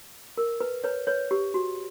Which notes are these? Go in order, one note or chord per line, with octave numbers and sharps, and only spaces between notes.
A#4
B4
B4 C#5
B4 C#5
G4
F#4